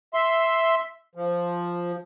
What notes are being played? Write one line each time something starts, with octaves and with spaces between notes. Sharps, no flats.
E5 C6
F3